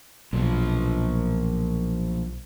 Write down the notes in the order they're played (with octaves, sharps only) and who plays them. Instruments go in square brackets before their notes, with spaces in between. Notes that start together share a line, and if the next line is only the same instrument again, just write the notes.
[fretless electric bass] B1 [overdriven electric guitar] A#2 F3